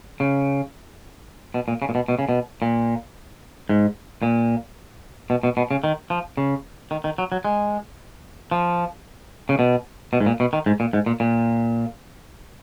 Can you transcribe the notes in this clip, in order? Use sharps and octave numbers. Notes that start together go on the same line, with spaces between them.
C#3
B2
A#2
C#3
A#2
B2
B2
C#3
B2
A#2
G#2
A#2
B2
B2
B2
C#3
D#3
F3
C#3
D#3
D#3
F#3
F#3
G#3
F3
C#3
B2
B2
G#2
A#2
B2
D#3
G#2
A#2
G#2
A#2
A#2